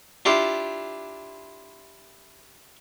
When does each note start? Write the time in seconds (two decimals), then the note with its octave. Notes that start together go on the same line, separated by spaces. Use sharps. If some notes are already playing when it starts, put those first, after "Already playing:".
0.25 D4 E4 F4 G4